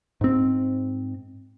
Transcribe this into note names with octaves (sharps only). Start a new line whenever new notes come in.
G#2 C4